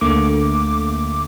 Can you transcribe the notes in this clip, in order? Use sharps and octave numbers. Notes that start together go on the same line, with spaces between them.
D2 D3 A3 A#3 D6